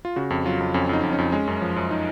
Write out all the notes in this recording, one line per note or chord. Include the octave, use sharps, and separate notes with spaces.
F4
C#3 F#4
F2
F#3 F4
F2
F2 C#4
F2 D#4
F2
C#4
F2
G#3 C#4
F#2
F3
F#2
D#4